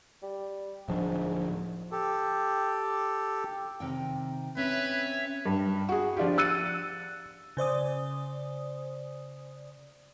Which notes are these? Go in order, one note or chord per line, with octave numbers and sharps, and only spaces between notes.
G3
D1 G#2 F3 D4
G4 A4
C3 D#3 G5
C4 C#4 B4 C#5 E5
G2
F#4 G#4
F3 D4 F4 G4
E6 F#6 A6 C#7 D#7
C#3 C5 D5 D#6